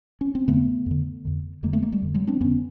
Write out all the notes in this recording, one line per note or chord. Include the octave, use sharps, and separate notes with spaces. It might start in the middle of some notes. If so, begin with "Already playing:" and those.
C#4
C4
F2 D3 A3 B3
F2 D3
F2 D3
F2 D3 G#3 A#3
A3 B3
G#3 A#3
G3 A3
F2 D3
F#3 G#3
C4 D4
F2 D3 B3 C#4